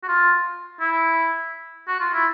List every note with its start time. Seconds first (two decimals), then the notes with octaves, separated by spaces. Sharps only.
0.03 F#4
0.08 F4
0.80 E4
1.88 F#4
2.00 F4
2.14 E4